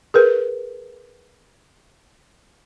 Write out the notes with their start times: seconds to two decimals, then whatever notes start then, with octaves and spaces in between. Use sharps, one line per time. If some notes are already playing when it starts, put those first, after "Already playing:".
0.14 G#4 A#4 B4